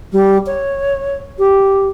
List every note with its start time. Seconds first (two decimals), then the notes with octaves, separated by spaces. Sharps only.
0.12 G3
0.46 C#5
1.38 G4